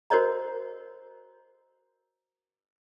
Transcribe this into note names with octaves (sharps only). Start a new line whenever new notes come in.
F#4 A#4 C5 C#5 D#5 A#5